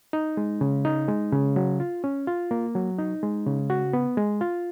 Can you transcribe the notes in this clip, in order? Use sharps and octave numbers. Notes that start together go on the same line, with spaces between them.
D#4
G#3
C#3
D#4
G#3
C#3
F#3
F4
C#4
F4
A#3
F#3
D#4
G#3
C#3
F#4
B3
G#3
F4